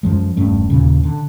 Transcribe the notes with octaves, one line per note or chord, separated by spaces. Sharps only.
F#2 F3 G#3
E1 G2 A3 C#4
D#2 A#2 C#3
D3